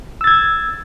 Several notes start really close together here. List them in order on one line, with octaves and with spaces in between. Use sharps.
E6 A6 G#6